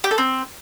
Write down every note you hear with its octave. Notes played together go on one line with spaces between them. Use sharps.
G4
A4
C4